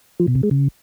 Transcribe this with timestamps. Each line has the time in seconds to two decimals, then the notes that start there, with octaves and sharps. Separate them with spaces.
0.20 F3
0.28 B2
0.35 C3
0.43 G#3
0.51 C#3